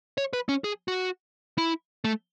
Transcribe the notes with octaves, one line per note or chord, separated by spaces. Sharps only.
C#5
B4
C#4
G#4
F#4
E4
A3